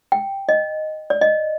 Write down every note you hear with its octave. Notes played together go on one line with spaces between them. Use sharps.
G5
D#5
D5
D#5